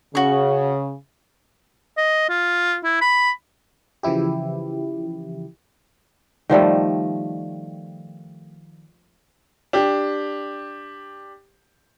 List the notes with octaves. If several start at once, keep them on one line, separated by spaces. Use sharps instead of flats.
C#3 F#4 C#6
D#5
F4
E4
B5
C#3 E3 F3 E4 G4
D#3 F3 G3 A3
D4 G4